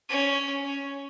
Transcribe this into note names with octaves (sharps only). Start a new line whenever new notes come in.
C#4
C#4